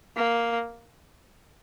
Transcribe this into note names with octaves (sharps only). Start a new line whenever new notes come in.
A#3